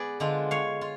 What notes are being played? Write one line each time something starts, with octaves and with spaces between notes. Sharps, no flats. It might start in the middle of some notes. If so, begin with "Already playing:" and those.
Already playing: B3 G#4 B4 D5
D3 G#3 D4 F4
C#5 F5
F4